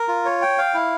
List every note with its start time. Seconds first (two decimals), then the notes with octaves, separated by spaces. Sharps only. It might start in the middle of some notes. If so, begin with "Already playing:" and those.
Already playing: A#4
0.08 F4
0.25 C#5
0.42 G5
0.58 F5
0.74 E4